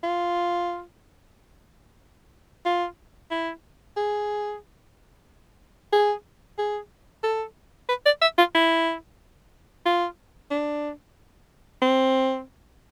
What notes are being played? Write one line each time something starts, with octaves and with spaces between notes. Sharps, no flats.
F4
F4
E4
G#4
G#4
G#4
A4
B4
D5
E5
F4
E4
F4
D4
C4